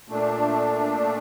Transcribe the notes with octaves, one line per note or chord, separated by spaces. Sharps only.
A#2 A3 D4